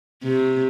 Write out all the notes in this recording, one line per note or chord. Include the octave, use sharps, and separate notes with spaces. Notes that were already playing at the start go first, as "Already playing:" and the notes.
C3